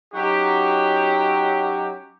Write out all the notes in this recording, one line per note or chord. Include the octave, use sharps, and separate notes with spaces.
F#3 C#4 D#4 F#4 G4